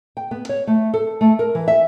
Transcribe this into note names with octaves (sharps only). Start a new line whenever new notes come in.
G5
B3
C#5
A3
A4
A3
A#4
E3
E5